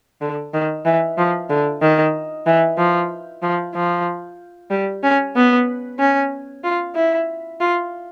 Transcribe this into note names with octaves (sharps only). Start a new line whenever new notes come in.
D3
D#3
E3
F3
D3
D#3
E3
F3
F3
F3
G3
C#4
B3
C#4
F4
E4
F4